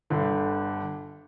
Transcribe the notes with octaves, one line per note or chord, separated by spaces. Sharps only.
G1 G2 D3